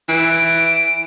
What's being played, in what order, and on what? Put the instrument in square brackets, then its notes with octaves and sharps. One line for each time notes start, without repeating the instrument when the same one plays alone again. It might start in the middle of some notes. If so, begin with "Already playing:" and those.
[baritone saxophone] E3 [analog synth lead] D7